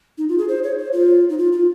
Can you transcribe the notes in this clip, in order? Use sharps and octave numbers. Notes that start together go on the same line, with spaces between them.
D#4
F4
G#4
C5
C#5
C5
F4
D#4
F4
F4